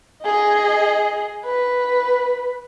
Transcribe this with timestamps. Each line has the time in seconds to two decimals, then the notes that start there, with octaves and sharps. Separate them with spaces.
0.23 G#4 D#5
1.45 B4